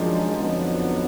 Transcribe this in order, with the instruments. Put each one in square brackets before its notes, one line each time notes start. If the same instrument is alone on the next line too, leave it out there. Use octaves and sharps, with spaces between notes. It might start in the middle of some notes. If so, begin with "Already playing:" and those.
Already playing: [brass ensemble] F#2 D#3 G#3 D4 [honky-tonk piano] F3
[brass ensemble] F2 D3 F#3 B3 D#4